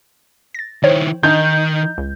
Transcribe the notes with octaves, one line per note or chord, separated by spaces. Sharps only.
A6 A#6
D#3 E4 C5 C#5 G5
D#3 D4 D#4 G6
C#2